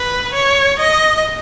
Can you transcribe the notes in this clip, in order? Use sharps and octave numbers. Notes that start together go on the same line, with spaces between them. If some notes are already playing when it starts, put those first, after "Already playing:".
Already playing: B4
C#5
D#5